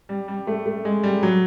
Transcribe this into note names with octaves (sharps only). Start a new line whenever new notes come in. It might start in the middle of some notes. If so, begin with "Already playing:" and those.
G3
G3
A3
A3
G#3
G3
F#3